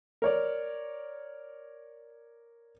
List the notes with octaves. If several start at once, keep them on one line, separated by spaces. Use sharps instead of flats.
A#4 C#5 D5